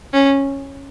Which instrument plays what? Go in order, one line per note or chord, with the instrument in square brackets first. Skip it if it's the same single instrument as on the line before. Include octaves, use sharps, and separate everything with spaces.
[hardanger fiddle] C#4